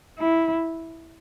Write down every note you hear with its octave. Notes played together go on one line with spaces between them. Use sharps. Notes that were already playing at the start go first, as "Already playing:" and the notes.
E4